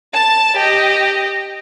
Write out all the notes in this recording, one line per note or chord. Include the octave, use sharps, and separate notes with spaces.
A5 A6
G4 D#5